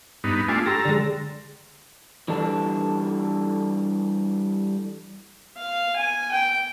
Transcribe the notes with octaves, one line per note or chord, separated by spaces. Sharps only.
G2 B3 D#4
A3 D4 F4 G#5 C#6
G4 A4 A#5 C6 E6
D3 G#3
E3 G3 D4 A4
F5
G#5
G5